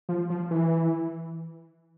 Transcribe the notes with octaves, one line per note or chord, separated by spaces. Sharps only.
F3
F3
E3